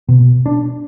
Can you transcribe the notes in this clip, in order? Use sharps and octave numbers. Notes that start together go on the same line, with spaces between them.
B2
D4